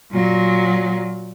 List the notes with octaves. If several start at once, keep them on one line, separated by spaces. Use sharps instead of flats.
A#2 F#3